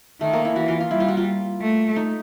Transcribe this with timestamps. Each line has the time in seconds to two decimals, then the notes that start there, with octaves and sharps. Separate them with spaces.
0.21 D#3 A3
0.33 A#3
0.45 E4
0.56 E3 F#4
0.68 F4
0.80 F4
0.91 G3 E4
1.00 F4
1.09 F#4
1.17 F4
1.61 A3
1.96 D#4